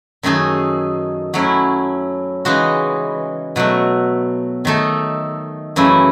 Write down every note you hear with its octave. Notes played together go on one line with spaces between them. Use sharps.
F#2 D#3 A3 D#4 G#4
F#3 A3 C#4 E4
C#3 E3 G#3 D#4 F#4
B2 F#3 A3
D#3 A3 D#4 A4
F#2 C#3 E3 A3 E4